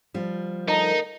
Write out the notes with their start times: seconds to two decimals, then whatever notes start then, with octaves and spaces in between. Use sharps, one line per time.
0.14 F3 G3
0.68 D3 A3 D#4 A#4 D#5 A5 A#5